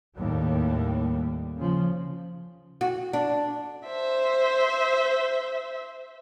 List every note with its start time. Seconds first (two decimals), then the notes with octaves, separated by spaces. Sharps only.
0.17 D#2 A2 G3
1.57 C#3 F3
2.81 F#4
3.13 D4
3.86 C5 E5